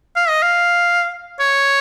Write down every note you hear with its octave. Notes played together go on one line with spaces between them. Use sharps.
F5
D#5
F5
C#5